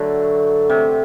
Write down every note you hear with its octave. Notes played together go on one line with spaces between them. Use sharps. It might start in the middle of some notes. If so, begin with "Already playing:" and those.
Already playing: D3 F#3 A3
C3